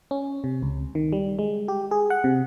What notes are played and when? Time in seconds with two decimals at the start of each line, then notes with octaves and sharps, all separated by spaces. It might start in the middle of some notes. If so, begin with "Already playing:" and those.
0.11 C#4
0.44 C3
0.62 C#2
0.95 D#3
1.13 G3
1.39 G#3
1.68 G4
1.91 G#4
2.10 F#5
2.24 C3